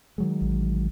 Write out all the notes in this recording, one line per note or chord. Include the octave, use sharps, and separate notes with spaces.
D#3 F#3 G#3
A1